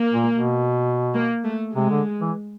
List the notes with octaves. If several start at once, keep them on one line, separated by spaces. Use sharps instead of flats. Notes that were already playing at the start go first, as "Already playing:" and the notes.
Already playing: A#3
A#2
B2
A#3
A3
C3 G#3
D3
E3